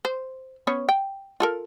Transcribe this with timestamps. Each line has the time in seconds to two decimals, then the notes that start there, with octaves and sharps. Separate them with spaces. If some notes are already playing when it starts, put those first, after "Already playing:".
0.05 C5
0.67 B3 C#4 C#5
0.89 G5
1.40 F4 A4 A#4